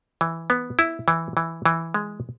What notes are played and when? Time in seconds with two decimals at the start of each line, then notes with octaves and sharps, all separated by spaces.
0.21 E3
0.50 B3
0.79 E4
1.08 E3
1.37 E3
1.65 E3
1.94 G#3